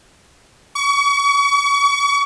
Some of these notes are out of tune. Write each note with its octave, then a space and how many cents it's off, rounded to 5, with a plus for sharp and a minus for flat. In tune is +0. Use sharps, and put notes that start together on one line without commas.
C#6 +35